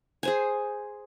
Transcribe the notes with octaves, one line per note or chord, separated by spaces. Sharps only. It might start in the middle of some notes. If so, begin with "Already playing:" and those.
G#4 C5 G#5